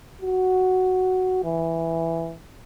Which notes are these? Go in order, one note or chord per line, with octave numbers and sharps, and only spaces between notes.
F#4
E3